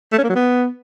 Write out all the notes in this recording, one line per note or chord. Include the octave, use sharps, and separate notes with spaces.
A3
C#4
A#3
F#3
B3